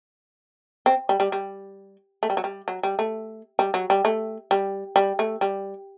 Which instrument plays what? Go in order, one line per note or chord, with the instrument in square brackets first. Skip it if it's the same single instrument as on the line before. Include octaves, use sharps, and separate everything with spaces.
[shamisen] C4
G3
G3
G3
A3
G3
F#3
G3
F#3
G3
A3
G3
F#3
G3
A3
G3
G3
A3
G3